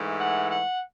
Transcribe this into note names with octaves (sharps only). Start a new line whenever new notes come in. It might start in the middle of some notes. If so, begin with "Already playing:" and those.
Already playing: G#2 E3 A3
F#5
F#5